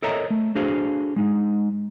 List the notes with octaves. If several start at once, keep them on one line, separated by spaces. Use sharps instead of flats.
A4 A#4 C#5 D#5 E5 A#5
A3
D4 F#4 G#4 A4 C5 F5
G#3 D#4